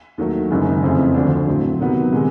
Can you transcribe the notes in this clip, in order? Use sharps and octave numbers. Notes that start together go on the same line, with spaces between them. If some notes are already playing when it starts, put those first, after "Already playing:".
D#2 D#3 F#3 A3
F#1 F#2 D#3 G#3
F2 C#3 E3 A3 C4
D2 D3 F3 A3 D4
A2 F#3 A3 C4
C3 D#3 F#3 B3
C3 D#3 G#3